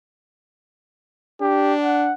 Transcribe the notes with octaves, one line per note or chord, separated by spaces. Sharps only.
D4 G4
F#5